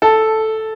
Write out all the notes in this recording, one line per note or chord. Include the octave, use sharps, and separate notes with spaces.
A4